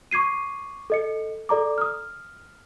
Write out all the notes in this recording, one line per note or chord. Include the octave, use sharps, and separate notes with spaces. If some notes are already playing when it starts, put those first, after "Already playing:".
C#6 D6 G#6 C7 D#7
A4 D#5 C#7
A4 D5 A#5 D6
D#6 F6